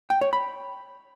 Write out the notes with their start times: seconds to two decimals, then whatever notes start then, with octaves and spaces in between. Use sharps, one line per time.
0.10 G5
0.21 C#5
0.33 B5